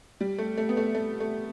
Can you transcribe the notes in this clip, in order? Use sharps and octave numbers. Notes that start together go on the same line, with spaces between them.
G3
A3
A3
B3
A3
A3
A3